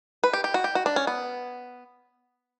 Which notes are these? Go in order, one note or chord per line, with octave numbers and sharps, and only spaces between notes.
B4
G4
G4
F#4
G4
F#4
D4
C#4
B3